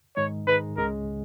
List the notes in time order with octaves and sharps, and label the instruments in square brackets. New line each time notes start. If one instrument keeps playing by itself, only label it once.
[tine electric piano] G#2 D#3 G#3 D#4 [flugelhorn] C#5
[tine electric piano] G#2 D#3 G#3 D#4 [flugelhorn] B4
[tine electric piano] C#2 C#3 G#3 C#4 G#4 [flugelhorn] A#4